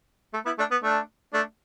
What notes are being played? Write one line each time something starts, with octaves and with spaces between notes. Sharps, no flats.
A3
B3 E4
A3 D4
B3
A3 D4
A3 D4